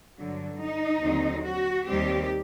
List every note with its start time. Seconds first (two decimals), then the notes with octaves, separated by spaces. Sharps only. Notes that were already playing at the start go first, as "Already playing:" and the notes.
0.19 G2 D3 F#3
0.61 D#4
1.03 D#2 D3 F#3 C4
1.46 F#4
1.88 D#2 D#3 G3 C4 G4